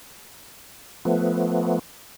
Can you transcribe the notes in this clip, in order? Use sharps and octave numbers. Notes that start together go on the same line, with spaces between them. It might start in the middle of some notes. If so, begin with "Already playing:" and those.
F3 A3 B3